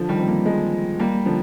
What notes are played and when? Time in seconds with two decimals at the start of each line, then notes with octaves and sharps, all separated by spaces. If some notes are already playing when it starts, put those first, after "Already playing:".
Already playing: D3 F3
0.09 D#3 G3
0.19 C4
0.28 G3 A#3
0.46 F3 G#3
1.00 G3 A#3
1.26 D3 F3